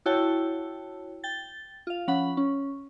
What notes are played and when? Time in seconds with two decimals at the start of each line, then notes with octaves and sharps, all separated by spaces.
0.06 E4 F#4 C#5 G5 A5
1.24 G5 A6
1.87 F4 F5
2.07 F3 C#4 F#5 B5
2.37 C#4